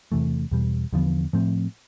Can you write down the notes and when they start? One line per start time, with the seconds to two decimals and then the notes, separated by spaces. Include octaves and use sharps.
0.12 E2 C3 E3 A3
0.51 E2 B2 G3
0.93 E2 D3 F3 B3
1.33 A2 F3 A3 C4